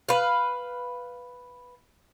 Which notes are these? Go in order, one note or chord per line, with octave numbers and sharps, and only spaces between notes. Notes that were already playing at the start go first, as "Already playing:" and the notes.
B4 F5